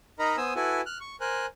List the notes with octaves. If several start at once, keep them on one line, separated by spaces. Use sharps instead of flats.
D#4 A#4 D#5 A#5 B5
B3 C5 G#5 D#6 E6
E4 F#4 A4 B4 G#5
F6 F#6
C#6
A#4 C5 G#5 F#6